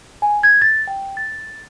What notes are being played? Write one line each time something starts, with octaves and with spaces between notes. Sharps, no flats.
G#5
G#6
A6
G5
A6